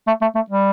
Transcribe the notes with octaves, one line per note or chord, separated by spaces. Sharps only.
A3
A3
A3
G3